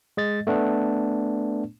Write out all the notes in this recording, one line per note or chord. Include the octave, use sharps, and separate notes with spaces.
G#3 D#5 A6
A3 B3 D4